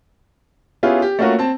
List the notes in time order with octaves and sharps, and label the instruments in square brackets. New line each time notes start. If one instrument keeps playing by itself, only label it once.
[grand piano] B3 C#4 E4 F4 G4 G#4
G4
A3 A#3 C#4 F4 F#4 A#4
C4 A5